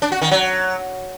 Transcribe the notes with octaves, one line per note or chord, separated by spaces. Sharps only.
D4
F#4
D#3
F#3